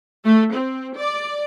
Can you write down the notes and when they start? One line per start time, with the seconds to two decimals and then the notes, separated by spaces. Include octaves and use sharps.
0.24 A3
0.54 C4
0.96 D5